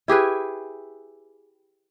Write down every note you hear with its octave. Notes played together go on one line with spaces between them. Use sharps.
E4 G4 G#4 B4